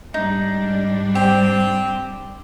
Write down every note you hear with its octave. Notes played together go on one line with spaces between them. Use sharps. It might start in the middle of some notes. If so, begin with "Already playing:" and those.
G#2 G3 D4 D#4
C4 G4